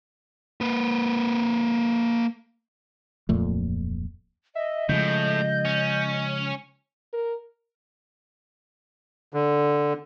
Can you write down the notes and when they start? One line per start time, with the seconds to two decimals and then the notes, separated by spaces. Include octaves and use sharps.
0.61 A#3 B4
3.29 D1 F2 A#2 A3
4.55 D#5 E5
4.89 A2 C#3 F3 G#3 G6
5.65 C#4
7.13 A#4
9.34 D3